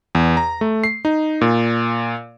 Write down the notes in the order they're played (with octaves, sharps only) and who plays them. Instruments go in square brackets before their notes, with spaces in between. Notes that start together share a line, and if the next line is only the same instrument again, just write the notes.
[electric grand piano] E2
A#5
A3
C7
D#4
A#2